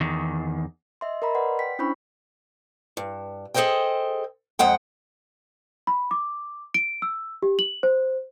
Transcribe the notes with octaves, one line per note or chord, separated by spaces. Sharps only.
E2 D#3
D#5 E5 C6
A#4 D#5 A#5 B5
B4 D5 F#5 C6
G5 B6
C#4 D4 E4 C5 B5 C#6
G2
G#4 A4 B4 C5 D#5 G5
F2 G#3 F#5 G5
B5
D6
D7
E6
G4
F#7
C5